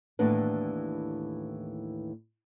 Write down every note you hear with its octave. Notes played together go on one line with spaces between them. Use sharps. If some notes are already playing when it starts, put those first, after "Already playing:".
D#2 A2 E3 B3 D4 B4